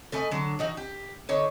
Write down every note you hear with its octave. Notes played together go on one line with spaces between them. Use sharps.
A3 B4 D#5 G#5
D3 F#3
E3 D#4 F#4
G4
D3 D#4 B4 C#5